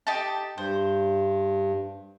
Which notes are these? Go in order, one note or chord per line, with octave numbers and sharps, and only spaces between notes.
D#4 G4 A5
G2 C5